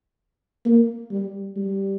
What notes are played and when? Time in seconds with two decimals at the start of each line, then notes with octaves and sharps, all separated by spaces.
0.65 A#3
1.11 G3
1.57 G3